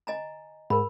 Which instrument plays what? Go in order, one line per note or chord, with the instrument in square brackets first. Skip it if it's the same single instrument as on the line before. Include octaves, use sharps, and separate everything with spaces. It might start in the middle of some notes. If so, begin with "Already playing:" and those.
[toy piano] D#5 G#5 A#5
[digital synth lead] G#2 [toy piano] A#4 B5